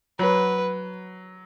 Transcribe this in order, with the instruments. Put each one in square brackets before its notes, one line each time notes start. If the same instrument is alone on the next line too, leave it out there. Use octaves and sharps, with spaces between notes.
[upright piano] F#3 [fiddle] B4